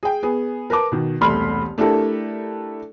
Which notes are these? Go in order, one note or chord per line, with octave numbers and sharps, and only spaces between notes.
G#4 G5
B3 G#4
A#4 B4 A5 D6
B2 D#3
E1 C2 A3 B5 C6 F6
A3 D4 E4 G4 A4 A#4